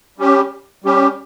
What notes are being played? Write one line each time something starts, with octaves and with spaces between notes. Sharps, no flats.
G3 C#4 G4
G3 C#4 G4